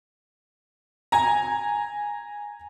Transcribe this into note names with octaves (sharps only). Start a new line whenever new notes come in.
G#5 A#5